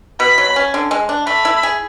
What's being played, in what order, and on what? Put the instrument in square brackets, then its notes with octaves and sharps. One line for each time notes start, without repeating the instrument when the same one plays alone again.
[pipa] B2 [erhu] B5
[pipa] F#3
C#4
D3
G#3
D4
[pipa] A3 [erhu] B5
[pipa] E4
G#4